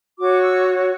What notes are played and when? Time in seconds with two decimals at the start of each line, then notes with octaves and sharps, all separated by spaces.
0.19 F#4 C#5 D6
0.42 E6